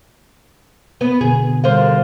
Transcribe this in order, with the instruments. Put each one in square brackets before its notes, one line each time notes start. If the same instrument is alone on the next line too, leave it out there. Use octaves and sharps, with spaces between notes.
[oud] B3
[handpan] B2 D3 B3 [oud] G#4
[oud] D3 C5 [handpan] G3 A#4 F5